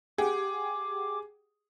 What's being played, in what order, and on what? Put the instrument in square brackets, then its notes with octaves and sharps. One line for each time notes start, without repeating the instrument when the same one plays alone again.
[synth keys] G4 F#5 G5 [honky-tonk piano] G#4 [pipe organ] D6